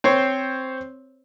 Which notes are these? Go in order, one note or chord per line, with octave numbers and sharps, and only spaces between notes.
C4 C5 C#5